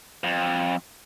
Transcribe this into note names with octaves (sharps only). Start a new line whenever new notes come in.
F2